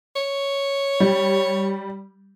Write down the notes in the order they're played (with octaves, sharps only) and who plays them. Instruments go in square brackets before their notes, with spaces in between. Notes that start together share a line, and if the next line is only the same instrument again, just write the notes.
[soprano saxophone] C#5
[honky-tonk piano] G3